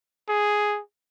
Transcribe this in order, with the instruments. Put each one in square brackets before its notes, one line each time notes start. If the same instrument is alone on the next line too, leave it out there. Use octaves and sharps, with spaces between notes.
[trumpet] G#4